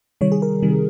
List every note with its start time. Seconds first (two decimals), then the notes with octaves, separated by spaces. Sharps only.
0.21 C3 D#3 G3 C#5
0.32 G#4
0.42 A#4
0.63 C3 D#3 G3